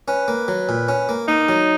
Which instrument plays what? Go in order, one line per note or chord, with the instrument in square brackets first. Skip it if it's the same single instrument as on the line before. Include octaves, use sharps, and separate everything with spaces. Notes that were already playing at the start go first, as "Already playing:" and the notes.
[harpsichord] C#4 [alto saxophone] B4
[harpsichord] A#3
F#3
A#2
C#4
A#3
[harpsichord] A#3 [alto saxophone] D#4
[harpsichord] F#3